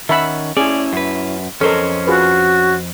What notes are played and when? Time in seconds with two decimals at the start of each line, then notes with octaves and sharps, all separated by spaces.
0.09 D#3 C#4 E5 F#5 A5 B5
0.57 C#4 E4 G#4 D5
0.93 F#2 B4
1.61 F2 C#4 A4 A#4 C5 D#5
2.07 F4 F#4 G#4 B4